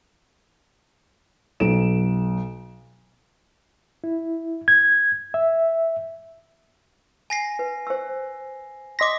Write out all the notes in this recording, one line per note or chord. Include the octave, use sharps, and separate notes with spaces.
B1 D7 E7
E4
G#6
E5
G#5 A#6 C7
B4
C5 E6
D#5 C6 D6 A#6 B6